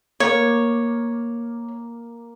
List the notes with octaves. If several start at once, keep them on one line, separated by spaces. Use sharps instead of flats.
A#3 C#5